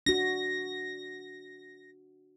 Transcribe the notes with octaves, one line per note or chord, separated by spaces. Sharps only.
D4 F#4 A#6